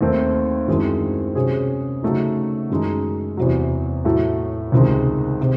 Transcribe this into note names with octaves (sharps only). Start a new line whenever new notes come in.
D#2 D#3 A3 C4
F#2 D#3 G#3 C4 E4
C3 F#3 C#4 G#4
C#3 F#3 A3 D#4
F#2 D#3 G#3 D#4
E2 C3 F#3
A2 F#3 A3
C#2 C3 D#3 G#3
C3